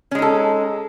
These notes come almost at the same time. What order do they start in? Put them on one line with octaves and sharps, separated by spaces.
C#4 G#3 D#4 A4